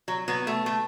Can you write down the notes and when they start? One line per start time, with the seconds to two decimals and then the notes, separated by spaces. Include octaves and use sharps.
0.08 F#3
0.28 F#3 B3
0.47 A3
0.66 A3